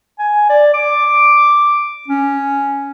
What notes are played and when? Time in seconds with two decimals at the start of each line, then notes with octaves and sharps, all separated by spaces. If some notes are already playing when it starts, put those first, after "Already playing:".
0.19 G#5
0.49 D5
0.74 D6
2.08 C#4